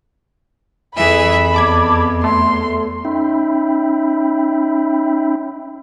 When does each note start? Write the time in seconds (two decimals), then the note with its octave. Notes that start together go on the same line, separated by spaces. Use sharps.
0.97 F2 E3 G#4 E5 B5
1.54 E2 A5 D6 G#6
2.24 A3 C6
3.05 C#4 D#4 E5 G5 B5